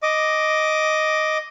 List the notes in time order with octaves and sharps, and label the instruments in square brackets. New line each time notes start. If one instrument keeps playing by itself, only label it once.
[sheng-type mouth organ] D#5 D6